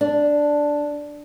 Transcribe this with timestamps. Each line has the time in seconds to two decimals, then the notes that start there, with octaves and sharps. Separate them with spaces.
0.01 D4